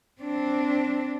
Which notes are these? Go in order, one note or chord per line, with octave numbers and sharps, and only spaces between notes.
C4 D4